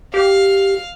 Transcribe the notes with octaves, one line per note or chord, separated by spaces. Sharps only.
G4 F5